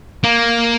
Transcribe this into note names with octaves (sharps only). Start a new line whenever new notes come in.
A#3